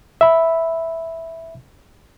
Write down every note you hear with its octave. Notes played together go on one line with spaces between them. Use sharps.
E5 B5